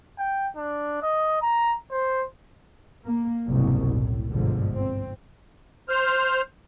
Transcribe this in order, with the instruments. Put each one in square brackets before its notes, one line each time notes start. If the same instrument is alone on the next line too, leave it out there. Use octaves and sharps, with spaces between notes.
[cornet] G5
D4
D#5
A#5
C5
[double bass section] A#3
F#1 C2 G#2 B2
A2
G1 G#2 B2 D3 F3
C4
[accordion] C5 F6